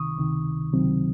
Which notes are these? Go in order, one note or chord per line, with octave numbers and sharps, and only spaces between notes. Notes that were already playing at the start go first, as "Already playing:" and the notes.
Already playing: C#2 C3 D#3 C#6 D#6
C#2 C3 D#3
C#2 C3 D#3 F#3 C4